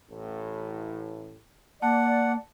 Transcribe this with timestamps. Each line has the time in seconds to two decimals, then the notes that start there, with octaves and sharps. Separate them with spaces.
0.10 A1 A2
1.82 A#3 D5 F#5 A5